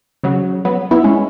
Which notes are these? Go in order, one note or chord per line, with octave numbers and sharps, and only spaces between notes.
C#3 F#3
F#3 B3
B3 E4
G#3 C#4